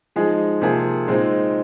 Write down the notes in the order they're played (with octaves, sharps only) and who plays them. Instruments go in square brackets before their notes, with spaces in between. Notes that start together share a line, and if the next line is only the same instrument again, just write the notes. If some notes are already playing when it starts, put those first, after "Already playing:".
[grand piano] F3 G#3 D#4 G#4
C3 F3 A#3 G#4
A#2 G#3 C4 D#4